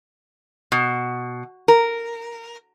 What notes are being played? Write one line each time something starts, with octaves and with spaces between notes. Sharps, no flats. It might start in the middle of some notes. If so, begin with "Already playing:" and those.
B2
A#4